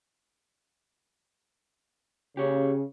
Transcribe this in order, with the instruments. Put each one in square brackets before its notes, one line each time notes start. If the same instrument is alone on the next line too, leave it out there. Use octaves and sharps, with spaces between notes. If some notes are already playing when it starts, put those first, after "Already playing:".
[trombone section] C#3 [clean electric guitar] G4 C#5